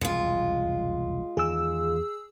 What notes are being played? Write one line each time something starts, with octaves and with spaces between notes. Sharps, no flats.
E1 C2 F2 G#3 F4
E2 D#3 G#4 E6